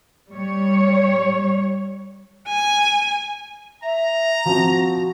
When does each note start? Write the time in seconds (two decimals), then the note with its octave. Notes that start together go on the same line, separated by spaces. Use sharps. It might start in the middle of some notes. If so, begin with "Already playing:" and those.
0.33 G3 C#5
2.48 G#5
3.83 E5 A#5
4.46 F3 C4 F#4